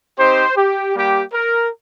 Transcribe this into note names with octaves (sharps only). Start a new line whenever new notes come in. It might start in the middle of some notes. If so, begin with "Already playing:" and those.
C4 D#4 G4 C5
G4
G3 A#3 G4
A#4